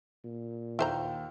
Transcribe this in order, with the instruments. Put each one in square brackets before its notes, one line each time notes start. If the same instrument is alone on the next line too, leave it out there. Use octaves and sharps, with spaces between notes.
[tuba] A#2
[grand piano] D#2 [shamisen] E4 C5 A#5